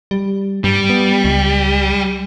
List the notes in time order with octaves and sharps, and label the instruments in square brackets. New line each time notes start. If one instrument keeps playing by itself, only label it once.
[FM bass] G3
[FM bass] G2 [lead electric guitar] G3
[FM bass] B3
C#2